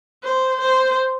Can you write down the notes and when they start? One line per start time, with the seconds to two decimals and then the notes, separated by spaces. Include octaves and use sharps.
0.24 C5
0.61 C5